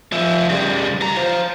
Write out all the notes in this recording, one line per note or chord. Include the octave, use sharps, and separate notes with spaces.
F3 E5
C#3 G3
E3 A#5
F4 C5